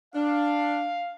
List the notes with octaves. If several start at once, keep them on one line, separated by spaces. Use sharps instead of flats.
D4 F5